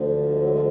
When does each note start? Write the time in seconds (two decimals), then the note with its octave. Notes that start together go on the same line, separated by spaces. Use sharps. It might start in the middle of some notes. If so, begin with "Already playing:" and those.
Already playing: D2 D3 F3
0.30 G#3
0.38 F#3
0.49 F3 G#3
0.55 F4